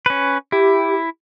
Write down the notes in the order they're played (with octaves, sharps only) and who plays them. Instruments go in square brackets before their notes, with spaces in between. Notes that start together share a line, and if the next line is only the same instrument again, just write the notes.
[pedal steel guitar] C#4 B4
[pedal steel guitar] E4 [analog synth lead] G4